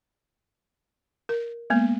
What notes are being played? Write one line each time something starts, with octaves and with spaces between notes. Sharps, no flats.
A#4
G#3 A#3 B3